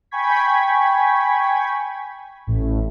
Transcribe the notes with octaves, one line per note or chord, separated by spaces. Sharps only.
G5 G#5 B5 C#6 G#6 B6
A1 A2